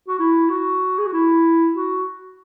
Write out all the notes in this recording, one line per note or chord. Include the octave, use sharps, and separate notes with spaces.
F#4
E4
F#4
G#4
F#4
E4
F#4